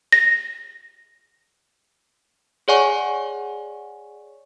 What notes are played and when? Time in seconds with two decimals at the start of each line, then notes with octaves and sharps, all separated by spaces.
0.12 A#6
2.68 G#4 C#5 D5 F#5 G#5 C#6